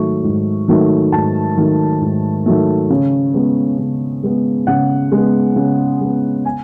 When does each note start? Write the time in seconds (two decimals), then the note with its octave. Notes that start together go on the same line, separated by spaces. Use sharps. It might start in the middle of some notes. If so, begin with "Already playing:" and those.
Already playing: G#2 D#3 F#3 A3 C#6
0.24 G#2
0.68 D#3 F#3 A3
1.12 G#2 A5
1.57 D#3 F#3 A3
2.01 G#2
2.46 D#3 F#3 A3
2.90 C#3
3.34 G#3 B3
3.78 C#3
4.23 G#3 B3
4.67 C#3 F#5
5.12 G#3 B3
5.56 C#3
6.01 G#3 B3
6.45 G#5